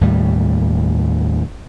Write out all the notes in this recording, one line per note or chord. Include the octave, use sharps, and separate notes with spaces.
D#2 A2 G3